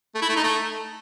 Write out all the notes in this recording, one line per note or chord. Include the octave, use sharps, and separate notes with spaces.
A3
E4
A3
D#4
A3